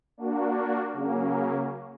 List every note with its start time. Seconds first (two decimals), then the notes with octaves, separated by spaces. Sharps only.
0.17 A#3 D4 F#4
0.93 C#3 F#3 A#3 C#4